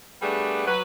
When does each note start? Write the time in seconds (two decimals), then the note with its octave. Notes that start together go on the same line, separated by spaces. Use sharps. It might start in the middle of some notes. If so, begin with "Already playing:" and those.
0.22 G3 A3 B3 D4 G#4
0.67 F#3 B4